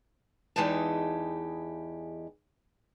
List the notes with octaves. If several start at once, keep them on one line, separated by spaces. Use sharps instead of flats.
E2 E3 G#3 D#4 G4 A5